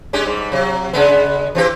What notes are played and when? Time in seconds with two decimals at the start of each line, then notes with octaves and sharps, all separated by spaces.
0.13 G#3 C#4 G4
0.26 G#2 G3
0.52 C3 F#3
0.93 C#3 G#3 B3
1.55 E3 C4 G4